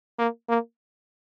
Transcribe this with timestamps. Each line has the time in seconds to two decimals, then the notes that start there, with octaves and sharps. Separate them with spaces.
0.19 A#3
0.49 A#3